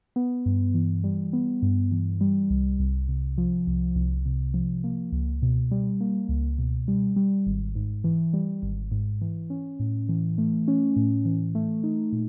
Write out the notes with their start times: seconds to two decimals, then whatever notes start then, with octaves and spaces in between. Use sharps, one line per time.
0.16 B3
0.46 G2
0.74 E3
1.04 G3
1.33 B3
1.62 G2
1.92 E3
2.21 G3
2.50 C2
2.80 C2
3.08 C3
3.38 F3
3.67 C2
3.95 C2
4.26 C3
4.54 F3
4.84 A#3
5.12 C#2
5.42 B2
5.71 G3
6.00 A#3
6.29 C#2
6.58 B2
6.88 G3
7.16 G3
7.46 G#1
7.75 G#2
8.04 E3
8.33 G3
8.62 G#1
8.91 G#2
9.21 E3
9.50 C#4
9.80 A2
10.09 E3
10.38 A3
10.68 C#4
10.96 A2
11.25 E3
11.55 A3
11.83 D#4
12.12 A#2